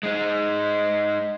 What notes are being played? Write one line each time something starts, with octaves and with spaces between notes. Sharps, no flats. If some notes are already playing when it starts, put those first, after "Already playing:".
G#3 D#4